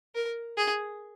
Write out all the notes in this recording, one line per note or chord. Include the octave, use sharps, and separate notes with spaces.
A#4
G#4